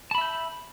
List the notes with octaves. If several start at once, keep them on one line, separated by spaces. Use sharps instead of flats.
E5 A5 B5 G6